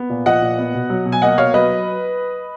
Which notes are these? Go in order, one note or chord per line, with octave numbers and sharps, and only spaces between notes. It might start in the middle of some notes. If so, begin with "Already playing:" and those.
Already playing: B3
A#2
F3 D#5 F#5
A#2
B3
B2
F#3
B2
G#5
A#3 D#5 F#5
B2 C#5 F5
F#3 B4 D#5